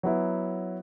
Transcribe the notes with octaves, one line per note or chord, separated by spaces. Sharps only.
F#3 B3 E4